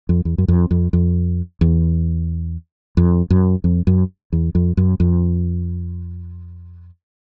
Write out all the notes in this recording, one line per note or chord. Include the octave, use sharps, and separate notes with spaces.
F2
E2
F#2
F2
F2
F2
E2
F2
F#2
F2
F#2
E2
F2
F#2
F2